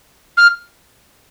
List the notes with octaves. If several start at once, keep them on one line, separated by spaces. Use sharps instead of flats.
F6